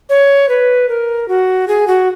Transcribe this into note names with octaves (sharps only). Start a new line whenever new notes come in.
C#5
B4
A#4
F#4
G#4
F#4